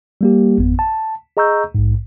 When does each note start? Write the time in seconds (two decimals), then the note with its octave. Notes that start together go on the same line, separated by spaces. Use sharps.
0.21 G3 A#3 G4
0.58 G#1 F2 B3
0.79 A5
1.37 G#4 D#5 A#5 C#6 E6 G6
1.75 A#1 G#2